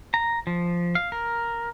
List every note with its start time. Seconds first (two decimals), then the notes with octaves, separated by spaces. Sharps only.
0.14 A#5
0.47 F3
0.95 F5
1.12 A#4